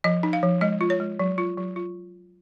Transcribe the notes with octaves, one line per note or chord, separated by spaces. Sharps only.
F3 D#5
D#4
F5
F3
G#3 D#5
F4
C#5
G#3
F#3
F4
F#3
F4